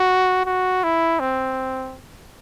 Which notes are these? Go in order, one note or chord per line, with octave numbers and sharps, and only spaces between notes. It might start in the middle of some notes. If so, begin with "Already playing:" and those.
Already playing: F#4
F#4
E4
C4